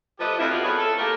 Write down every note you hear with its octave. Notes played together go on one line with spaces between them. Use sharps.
F3 A3 G4 A4 B4 D#5
F2 E4
F#3 B3 G4 D5 D#5 F5
B3 E4 G#4 A4 B4 C#5
A4
A3 A#3 G4 A#4